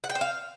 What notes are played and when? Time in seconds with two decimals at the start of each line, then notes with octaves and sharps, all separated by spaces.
0.04 F#5
0.10 G5
0.15 C5
0.21 F5